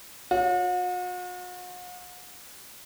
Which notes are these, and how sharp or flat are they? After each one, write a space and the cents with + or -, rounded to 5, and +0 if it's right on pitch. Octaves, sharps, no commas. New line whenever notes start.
F#4 -45 C#5 +0